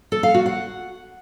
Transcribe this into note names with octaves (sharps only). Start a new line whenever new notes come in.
A4
F5
F#4
F#5